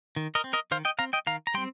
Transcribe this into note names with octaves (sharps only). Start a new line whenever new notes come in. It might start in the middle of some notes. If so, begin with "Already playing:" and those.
D#3
A#4 D#5
C4
A#4 D#5
D#3 C5 F5
D#5 G5
C4 F5 A#5
D#5 G5
D#3 F5 A#5
A#5
G3 C4 G5 C6